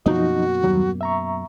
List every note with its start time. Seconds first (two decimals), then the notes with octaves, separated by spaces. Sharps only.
0.06 F#2 B2 F3 A#3 D#4 F#4 D#5
0.63 D#2 F#3 G3
1.01 E5 A#5 C#6